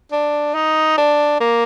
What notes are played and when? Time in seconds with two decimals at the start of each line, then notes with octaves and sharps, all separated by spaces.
0.12 D4
0.55 D#4
0.97 D4
1.40 A#3